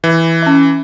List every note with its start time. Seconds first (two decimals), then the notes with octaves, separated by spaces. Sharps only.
0.04 E3
0.42 C#4 E5